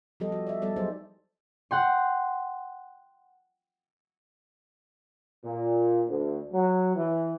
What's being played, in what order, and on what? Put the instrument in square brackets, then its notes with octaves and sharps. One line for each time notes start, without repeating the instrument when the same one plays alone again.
[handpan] F3 G3 B3 G4 A4 D#5
F#4
D5 E5
G3 G#3 B3 A4 D5
F#3 D#4 G#4 C5
[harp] F#5 G5 C6
[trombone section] A#2
D2
F#3
E3